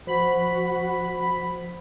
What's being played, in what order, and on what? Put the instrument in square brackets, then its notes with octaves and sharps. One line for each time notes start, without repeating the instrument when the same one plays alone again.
[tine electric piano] F3 C5 [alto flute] F#4 [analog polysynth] B5